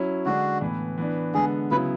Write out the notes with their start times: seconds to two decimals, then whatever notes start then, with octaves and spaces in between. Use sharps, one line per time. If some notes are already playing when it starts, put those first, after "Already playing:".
Already playing: F#3 C#4 E4
0.26 D3 G#3 D4 F#4
0.61 A2 E3 B3
0.98 E3 B3 D4
1.34 D3 G#3 B3 G#4
1.71 C#3 F#3 B3 E4 B4